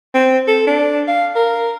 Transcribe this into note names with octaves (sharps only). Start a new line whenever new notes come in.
C4
A4
D4
F5
A#4